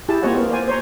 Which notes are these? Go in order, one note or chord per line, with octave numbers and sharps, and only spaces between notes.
E4 G4 G#4 A5
A#3 C4 F4 C#5 D#5 F#5
B3 A#4
A#4 C5 D5 G#5
C5 C#5 A#5